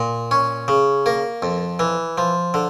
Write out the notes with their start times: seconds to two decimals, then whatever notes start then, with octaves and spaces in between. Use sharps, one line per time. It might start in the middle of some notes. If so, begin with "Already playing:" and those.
Already playing: A#2
0.31 C#4
0.68 C#3
1.06 A#3
1.42 F2
1.79 E3
2.18 F3
2.54 D3